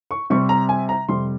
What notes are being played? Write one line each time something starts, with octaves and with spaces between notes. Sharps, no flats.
C#6
C3 G3 C4 C#6
A#5
G#5
A#5
F2 C3 G3 C6